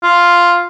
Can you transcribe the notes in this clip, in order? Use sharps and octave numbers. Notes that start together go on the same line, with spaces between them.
F4